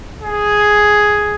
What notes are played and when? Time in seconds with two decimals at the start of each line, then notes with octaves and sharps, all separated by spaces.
0.21 G#4